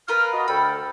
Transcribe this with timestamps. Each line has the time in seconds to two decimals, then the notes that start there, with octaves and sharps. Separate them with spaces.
0.08 F4 A#4 B4 F6
0.33 F#4 D#5
0.48 D2 A4 G5 B5